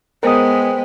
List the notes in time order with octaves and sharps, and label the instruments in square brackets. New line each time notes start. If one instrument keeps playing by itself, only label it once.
[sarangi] G#3 [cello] B3 [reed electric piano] A#4 D#6 [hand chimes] C5 G5